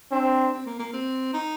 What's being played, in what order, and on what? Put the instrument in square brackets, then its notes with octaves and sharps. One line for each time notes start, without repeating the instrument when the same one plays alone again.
[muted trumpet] C4 [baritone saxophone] D4
[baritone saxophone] C4
A#3
A#3
C4
D#4